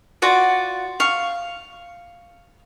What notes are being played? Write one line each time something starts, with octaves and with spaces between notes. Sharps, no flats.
F4 F#4 D5 F#5
F5 C#6